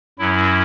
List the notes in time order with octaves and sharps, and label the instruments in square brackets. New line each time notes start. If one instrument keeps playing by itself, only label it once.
[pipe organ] F#2 F#3 C#4 E4